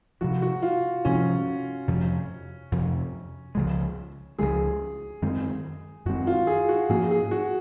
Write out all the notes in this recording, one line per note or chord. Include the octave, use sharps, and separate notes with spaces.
C3 F3 G#3 F#4
F#4
F4
C3 F3 G#3 C#4
F2 C3 F3
F2 C3 F3
C#2 C#3 F3 G#3
C#2 C#3 F3 G#3 G#4
F#2 D#3 G#3 C4
F#2 D#3 G#3 C4 F#4
F4
G#4
F#4
G#2 F3 A#3 C#4 G#4
G#4
F#4